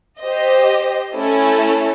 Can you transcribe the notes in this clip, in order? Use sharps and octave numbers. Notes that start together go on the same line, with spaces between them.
G4 C5 D#5
A3 C#4 E4 A4